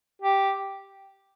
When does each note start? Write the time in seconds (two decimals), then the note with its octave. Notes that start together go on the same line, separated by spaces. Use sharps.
0.22 G4